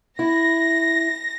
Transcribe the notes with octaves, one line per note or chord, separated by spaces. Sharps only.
E4 A#6